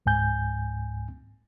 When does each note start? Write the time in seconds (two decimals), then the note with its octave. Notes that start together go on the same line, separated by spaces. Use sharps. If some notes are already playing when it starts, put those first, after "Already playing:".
0.06 C#2 G#2 G#5 G6